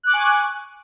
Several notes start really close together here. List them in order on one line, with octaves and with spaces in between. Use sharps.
F#6 D6 C#6 G#5